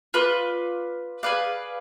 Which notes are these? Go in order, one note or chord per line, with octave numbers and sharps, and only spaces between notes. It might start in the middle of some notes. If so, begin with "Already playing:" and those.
F4 B4 D5
G#4 B4 D5 F5